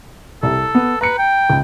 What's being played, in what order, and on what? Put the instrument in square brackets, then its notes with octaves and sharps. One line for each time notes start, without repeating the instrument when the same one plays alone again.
[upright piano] C2 [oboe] A4
[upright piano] B3
[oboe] B4 [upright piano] A#5 C#7
[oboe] G5
[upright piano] C#2